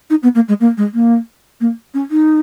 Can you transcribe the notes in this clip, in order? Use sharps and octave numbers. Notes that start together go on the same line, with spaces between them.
D#4
B3
A#3
G#3
A#3
G#3
A#3
A#3
C#4
D#4